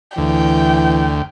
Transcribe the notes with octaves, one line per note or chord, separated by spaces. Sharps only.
D2 E3 G5